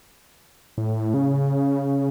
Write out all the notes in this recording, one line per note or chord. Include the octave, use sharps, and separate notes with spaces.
A2
C#3